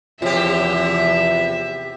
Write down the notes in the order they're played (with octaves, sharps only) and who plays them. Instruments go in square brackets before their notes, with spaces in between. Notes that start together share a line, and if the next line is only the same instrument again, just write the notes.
[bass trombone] E2 [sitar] C3 G4 [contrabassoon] F3 [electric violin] E5